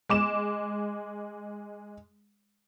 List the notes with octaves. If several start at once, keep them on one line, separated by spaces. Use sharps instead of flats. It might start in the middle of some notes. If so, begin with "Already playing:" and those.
G#3 D6 E7